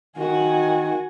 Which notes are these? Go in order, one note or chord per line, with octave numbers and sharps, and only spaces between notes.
D#3 F#4 G#5